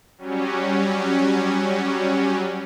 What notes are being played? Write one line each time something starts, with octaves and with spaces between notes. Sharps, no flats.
F#3 G3 C#4